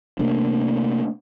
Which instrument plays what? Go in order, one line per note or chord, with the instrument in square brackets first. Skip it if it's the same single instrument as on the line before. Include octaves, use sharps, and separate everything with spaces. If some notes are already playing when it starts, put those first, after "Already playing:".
[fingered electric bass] C3 A3 A#3 D4